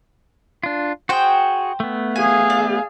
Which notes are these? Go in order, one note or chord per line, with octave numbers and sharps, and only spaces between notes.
D4 F4
F#4 G#4 C5 G5
A3 B3
G#4 F5 G#5
D5